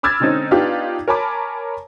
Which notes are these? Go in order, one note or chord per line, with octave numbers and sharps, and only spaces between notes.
B5 D6 E6 F6 G#6 A6
D3 G#3 C4 C#4 D#4
B3 D4 D#4 F4 G4
A#4 C#5 G#5 A5 B5 D6